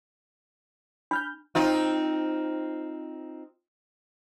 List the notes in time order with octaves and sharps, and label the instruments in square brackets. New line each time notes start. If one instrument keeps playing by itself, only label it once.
[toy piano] D4 [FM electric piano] B5 F6 G6
[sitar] C4 D#4 F4